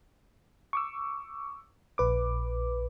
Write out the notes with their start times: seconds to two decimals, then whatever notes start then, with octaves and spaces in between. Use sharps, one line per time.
0.73 C#6 D6 E6
1.98 A#1 B4 D6